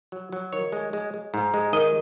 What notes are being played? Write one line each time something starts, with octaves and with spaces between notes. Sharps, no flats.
F#3
F#3
D#3 C#5
G#3
G#3
G#3
G#2
G#3
D#3 D#5